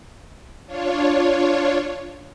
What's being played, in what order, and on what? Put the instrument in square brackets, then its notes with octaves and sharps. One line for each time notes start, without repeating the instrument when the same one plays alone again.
[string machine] D4 F4 C#5